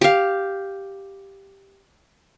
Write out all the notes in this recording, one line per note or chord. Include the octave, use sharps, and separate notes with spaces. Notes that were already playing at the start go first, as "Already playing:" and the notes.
G4 F5